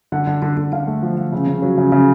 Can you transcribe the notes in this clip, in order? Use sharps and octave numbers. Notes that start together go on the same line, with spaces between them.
D3 F#5
D3
D3
D3
D3 F5
A3
F3
F3
C#3
C#3
F#3
C#3
C#3